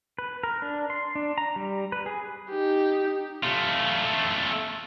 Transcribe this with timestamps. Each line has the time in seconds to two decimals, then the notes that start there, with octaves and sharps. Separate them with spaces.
0.19 B4
0.43 A#4
0.62 D4
0.90 C6
1.15 D4
1.38 A#5
1.56 G3
1.92 B4
2.06 G#4
2.50 D#4 G4
3.43 A3 F4